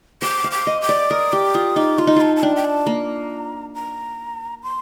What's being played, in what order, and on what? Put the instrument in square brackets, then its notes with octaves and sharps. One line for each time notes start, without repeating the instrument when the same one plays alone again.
[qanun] C5 [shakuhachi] D6
[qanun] F5
[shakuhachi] D6
[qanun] D#5
[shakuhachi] D6
[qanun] D5
[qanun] A#4 [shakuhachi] D#6
[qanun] G4 [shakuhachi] D6
[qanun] F4 [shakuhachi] D#6
[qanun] D#4 [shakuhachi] D6
[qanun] F4 [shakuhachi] C6
[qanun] D#4
[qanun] F4 [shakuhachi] A5
[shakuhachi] A5
[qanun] D4 [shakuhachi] G5
[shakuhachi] G5
A5
[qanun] A#3 [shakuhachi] A#5
[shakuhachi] A#5
C6